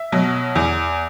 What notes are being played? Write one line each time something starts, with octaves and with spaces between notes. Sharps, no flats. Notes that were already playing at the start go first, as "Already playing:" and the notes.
Already playing: E5
B2 F#3
E2